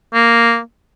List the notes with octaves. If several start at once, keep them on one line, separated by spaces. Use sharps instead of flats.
A#3